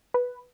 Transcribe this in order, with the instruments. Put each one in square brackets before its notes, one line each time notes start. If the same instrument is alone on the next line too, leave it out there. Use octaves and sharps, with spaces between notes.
[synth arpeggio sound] B4